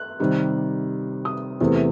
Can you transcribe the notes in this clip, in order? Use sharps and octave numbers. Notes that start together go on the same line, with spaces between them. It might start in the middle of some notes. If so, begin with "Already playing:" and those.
Already playing: F#6
C3 D#3 G3
D#6
E2 C3 E3 A3